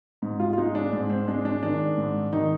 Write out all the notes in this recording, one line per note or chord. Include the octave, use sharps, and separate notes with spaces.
G#2 D#4
F4
F4
G#3 D#4
D4
G#2
C4
G#3 D4
D4
D#3 D4
G#2
D#3 D#4